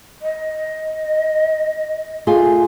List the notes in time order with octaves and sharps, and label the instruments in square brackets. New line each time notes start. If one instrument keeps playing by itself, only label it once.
[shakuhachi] D#5
[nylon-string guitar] A3 F4 G#4